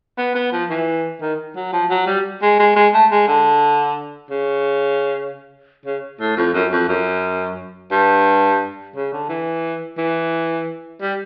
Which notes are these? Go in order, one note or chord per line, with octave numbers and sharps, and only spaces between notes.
B3
B3
F3
E3
D#3
F#3
F3
F#3
G3
G#3
G#3
G#3
A3
G#3
D3
C#3
C#3
A2
F2
F#2
F2
F#2
G2
C#3
D3
E3
E3
G3